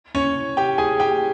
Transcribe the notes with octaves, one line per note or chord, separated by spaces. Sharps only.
C#4 C#5
G4 G5
G#4 G#5
G4 G5